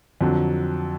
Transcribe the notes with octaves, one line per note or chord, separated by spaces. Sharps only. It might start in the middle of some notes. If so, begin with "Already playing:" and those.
F2 D3 F#3